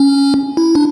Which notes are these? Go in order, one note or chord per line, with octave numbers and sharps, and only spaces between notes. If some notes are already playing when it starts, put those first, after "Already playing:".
Already playing: C#4
E4
D4